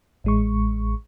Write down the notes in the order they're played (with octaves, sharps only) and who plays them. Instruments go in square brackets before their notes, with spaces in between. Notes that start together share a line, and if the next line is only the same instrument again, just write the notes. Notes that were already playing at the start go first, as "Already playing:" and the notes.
[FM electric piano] A1 G#3 C#6